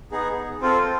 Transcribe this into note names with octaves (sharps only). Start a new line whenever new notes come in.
B3 D#4 G#4
C4 F4 A4